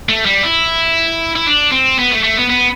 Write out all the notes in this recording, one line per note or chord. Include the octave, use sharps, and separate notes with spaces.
A3
G3
E4
E4
D4
C4
B3
A3
A3
B3
B3